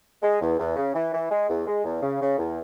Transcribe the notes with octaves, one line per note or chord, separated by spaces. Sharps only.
G#3
E2
E2
C#3
E3
E3
G#3
E2
G#3
E2
C#3
C#3
E2